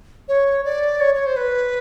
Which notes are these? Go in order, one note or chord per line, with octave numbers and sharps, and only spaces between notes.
C#5
D5
C#5
C#5
C5
B4